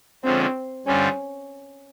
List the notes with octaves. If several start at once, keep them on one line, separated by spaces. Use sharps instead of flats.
D3 F3 G#3 C4 C#4
G2 D3 G3 C4 C#4 F4